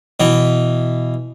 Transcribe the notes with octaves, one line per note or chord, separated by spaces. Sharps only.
B2 E3